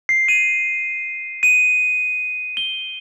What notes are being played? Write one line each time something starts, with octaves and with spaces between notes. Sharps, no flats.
C7
D#7
D#7
G7